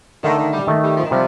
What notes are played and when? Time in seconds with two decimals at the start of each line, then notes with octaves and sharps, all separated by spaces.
0.23 D3 D#3 A3 D#4 A4
0.38 D#3
0.52 G3
0.67 D#3 A3 D#4
0.83 G3
0.97 F3
1.04 D#3
1.11 C3 F3 G3